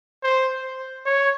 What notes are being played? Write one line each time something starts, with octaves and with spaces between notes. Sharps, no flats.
C5
C#5